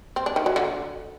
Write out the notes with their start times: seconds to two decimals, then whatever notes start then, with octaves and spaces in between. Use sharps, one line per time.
0.16 C4
0.26 D4
0.36 D#3
0.46 F#3
0.56 D3